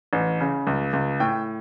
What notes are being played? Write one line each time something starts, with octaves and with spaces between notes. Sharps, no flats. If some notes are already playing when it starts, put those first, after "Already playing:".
A1
C#3
C#2
C#2
A2 G5